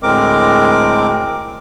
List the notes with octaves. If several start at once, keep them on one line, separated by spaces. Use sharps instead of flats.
D2 A2 G#3 C4 A#4 D6